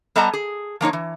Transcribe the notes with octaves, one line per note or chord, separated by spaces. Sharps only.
G3 B3 A4 D#5 A5 A#5
G#4
F3 A#3 D#4 C#5
E3